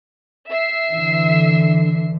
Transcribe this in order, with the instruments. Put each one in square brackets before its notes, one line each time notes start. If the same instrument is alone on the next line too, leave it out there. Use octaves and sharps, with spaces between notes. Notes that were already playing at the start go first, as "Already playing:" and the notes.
[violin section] E5 C7
[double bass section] D3 E3